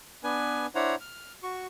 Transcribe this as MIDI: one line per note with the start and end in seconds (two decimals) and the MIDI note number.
0.24 0.66 59
0.24 0.66 62
0.24 0.66 71
0.24 0.66 80
0.75 0.95 62
0.75 0.95 64
0.75 0.95 72
0.75 0.95 73
0.75 0.95 78
0.75 0.95 82
1.00 1.33 89
1.43 1.67 66
1.43 1.67 85